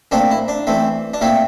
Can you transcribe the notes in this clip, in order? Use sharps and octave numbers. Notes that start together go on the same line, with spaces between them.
A#2 A3 C4 D4
E4
D4
E3 A3 C4
D4
A#2 A3 C4 E4